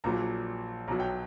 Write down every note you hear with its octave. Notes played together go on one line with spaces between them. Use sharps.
A#1 A#2 F#3 A#5
B1 B2 F#3 A#5
G5